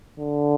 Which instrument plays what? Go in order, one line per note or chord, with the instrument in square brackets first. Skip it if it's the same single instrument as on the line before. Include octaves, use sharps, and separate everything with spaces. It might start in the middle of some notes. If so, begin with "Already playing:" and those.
[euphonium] D3